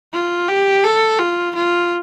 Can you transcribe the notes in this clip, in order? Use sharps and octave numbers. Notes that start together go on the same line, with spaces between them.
F4
G4
A4
F4
F4